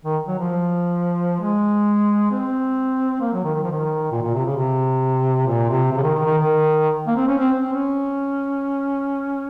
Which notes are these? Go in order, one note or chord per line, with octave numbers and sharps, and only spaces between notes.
D#3
F#3
F3
G#3
C4
A#3
F#3
D#3
D#3
F3
D#3
A#2
A#2
C3
C#3
C3
A#2
C3
C3
C#3
D#3
D#3
D#3
D#3
A#3
C4
C#4
C4
C4
C#4